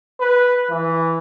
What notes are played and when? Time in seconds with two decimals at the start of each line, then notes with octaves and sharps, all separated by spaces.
0.21 B4
0.71 E3